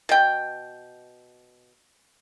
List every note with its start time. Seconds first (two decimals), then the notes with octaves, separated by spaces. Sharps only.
0.09 B2 G5